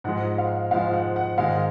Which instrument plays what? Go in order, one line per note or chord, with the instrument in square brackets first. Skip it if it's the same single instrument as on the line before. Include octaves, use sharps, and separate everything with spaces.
[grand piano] G#2 F3 G#3 [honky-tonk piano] F#5
[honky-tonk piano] F5
[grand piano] G#2 F3 G#3 [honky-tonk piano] F5
[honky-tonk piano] F#5
F#5
[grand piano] G#2 D#3 G#3 [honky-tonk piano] F5